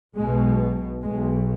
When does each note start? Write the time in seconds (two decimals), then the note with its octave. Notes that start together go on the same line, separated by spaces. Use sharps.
0.17 B1 B2 G#3
1.03 B1 B2 G#3